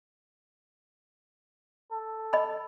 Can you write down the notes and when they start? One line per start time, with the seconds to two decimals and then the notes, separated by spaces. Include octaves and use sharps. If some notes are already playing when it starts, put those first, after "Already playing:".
1.92 A4
2.33 D#5 B5